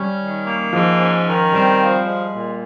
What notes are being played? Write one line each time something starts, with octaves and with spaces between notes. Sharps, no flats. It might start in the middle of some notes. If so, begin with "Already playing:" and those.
Already playing: G3 C#4
D#3
A#3
G#2 F3
C#4
D#3
G3 C4
F3
G#3
A#2